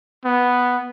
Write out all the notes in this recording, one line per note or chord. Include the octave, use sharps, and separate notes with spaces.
B3